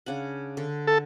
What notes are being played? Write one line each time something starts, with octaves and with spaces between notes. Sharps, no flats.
C#3 D4 F#5
D3
A4